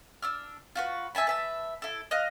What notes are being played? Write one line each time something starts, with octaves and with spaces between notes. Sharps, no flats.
D4 E6 F6
F4 F#4 B4
E5 G#5 A5 B5
B4 E5 A5
E4 A4
D#5 F5 F#6